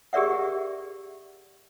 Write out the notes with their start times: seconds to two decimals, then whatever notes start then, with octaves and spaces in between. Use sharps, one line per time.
0.13 G4 G#4 A#4 D5 E5 F#5